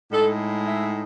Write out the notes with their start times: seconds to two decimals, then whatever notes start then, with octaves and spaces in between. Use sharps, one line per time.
0.12 A2 G#3 D#4 A4
0.67 E5